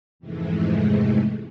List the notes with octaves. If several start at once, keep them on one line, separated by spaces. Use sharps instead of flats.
F2 G#2 C3 E3 G#3 A3